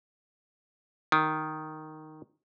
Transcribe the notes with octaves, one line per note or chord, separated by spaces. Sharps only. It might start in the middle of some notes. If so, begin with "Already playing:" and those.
D#3